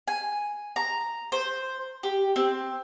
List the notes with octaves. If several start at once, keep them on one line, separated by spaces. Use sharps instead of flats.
G#5
A#5
C5
G4
C4